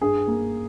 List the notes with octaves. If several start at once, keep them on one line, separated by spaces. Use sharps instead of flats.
G2 G#4
A#3